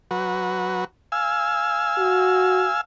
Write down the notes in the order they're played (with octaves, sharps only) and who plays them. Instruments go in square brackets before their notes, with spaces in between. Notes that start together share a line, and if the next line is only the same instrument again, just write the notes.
[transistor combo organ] F#3 F#4 B4
F5 G#5 E6
[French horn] F#4